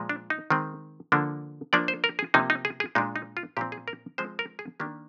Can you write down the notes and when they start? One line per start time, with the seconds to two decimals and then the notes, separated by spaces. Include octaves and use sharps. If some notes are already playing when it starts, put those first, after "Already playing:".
Already playing: A#2 F3 G#3
0.09 D4
0.30 D#4
0.50 D#3 G#3 C4
1.12 D3 F3 A#3 D4
1.73 F3 A#3 D4 D5
1.88 C5
2.04 A#4
2.19 G#4
2.34 C3 F3 A#3 D#4
2.50 D#4
2.65 G#4
2.80 G#4
2.95 A#2 G#3 D4 D#4
3.16 D#4
3.37 F4
3.57 A#2 F3 C4 G4
3.72 G#4
3.88 A#4
4.18 F3 G#3 C4 C5
4.39 A#4
4.59 G#4
4.80 D#3 A#3 D4 G4